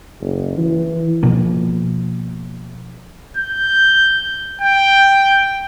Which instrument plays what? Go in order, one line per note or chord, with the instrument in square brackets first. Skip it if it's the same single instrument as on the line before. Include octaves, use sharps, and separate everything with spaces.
[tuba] F#1
E3
[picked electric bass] B2 F3 A#3
[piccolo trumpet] G6
G5